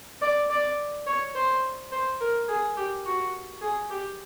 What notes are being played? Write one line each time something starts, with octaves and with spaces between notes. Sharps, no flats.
D5
D5
C#5
C5
C5
A#4
G#4
G4
F#4
G#4
G4